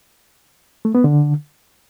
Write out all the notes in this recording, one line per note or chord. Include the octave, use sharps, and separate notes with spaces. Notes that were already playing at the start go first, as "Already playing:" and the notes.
A3
B3
D3